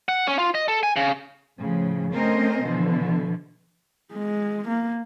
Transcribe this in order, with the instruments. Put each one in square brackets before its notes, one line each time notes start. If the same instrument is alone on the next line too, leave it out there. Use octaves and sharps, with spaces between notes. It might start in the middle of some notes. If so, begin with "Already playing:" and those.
[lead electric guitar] F#5
C#4
F4
D#5
A4
G#5
C#3
[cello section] A2 C#3 F3
A3 C4 C#4 A#4 C5 D#5
B2 D3 E3 F3
[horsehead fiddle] G#3
A#3